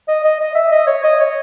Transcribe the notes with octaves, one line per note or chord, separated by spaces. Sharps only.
D#5
D#5
D#5
E5
D#5
C#5
D#5
C#5